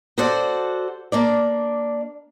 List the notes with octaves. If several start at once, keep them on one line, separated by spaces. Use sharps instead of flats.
F#4 A4 C5 D5 F#5
A#3 D4 D5